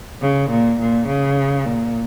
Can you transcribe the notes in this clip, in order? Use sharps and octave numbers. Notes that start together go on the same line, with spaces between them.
C#3
A#2
A#2
C#3
A#2